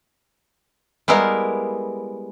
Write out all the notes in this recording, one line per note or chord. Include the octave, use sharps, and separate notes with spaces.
G3 G#3 B3 E4 A#4 F5